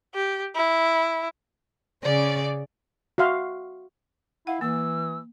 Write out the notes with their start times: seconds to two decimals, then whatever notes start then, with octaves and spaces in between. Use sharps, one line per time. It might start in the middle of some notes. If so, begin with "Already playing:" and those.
0.14 G4
0.56 E4
2.04 C#3 C#4 D5
3.18 F#4 E5 F5 C6
4.47 E4 F5 F#5
4.61 E3 A#3 E6